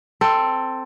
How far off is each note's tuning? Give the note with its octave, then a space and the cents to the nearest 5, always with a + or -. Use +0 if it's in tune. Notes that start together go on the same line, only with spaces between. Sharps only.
C4 +0 A4 +15